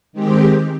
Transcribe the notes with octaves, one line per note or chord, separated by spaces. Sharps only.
D#3 G#3 C4 G4